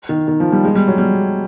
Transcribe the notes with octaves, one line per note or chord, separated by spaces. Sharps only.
D#3
D#3
F3
G3
G#3
G3
F#3
G3